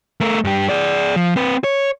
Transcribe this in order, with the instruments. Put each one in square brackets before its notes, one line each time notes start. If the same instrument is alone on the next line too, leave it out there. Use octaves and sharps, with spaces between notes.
[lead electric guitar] A3 A#4
G2 G4
G#4 D5
F3
C4 B4
C#5